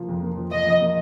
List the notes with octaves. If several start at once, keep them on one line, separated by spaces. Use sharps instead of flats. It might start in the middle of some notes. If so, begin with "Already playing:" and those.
Already playing: F3 A#3 F4
F2
A#3
F3
F4 D#5
F2
A#3